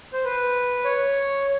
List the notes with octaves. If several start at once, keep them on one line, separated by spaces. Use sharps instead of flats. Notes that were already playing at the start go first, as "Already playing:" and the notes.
C5
B4
C#5